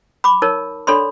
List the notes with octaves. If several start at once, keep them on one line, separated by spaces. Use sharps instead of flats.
B5 D6
D#4 A#4 C#5 A5
D4 A4 C#5 D5 B5 C6